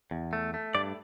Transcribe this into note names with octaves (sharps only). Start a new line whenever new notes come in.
E2
A3
A3
G2 D5